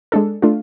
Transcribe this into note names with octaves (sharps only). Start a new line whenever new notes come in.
G#3 D4 A4
A3 D4 F4